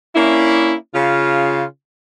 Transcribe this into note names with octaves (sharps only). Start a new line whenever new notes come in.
A#3 C#4 D4 E4
C#3 F4